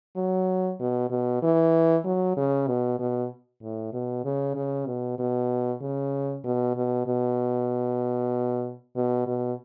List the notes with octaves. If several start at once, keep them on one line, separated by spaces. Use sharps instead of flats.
F#3
B2
B2
E3
F#3
C#3
B2
B2
A2
B2
C#3
C#3
B2
B2
C#3
B2
B2
B2
B2
B2